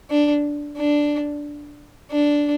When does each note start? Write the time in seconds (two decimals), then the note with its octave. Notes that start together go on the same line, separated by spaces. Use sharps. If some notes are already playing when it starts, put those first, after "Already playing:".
0.10 D4
0.77 D4
2.11 D4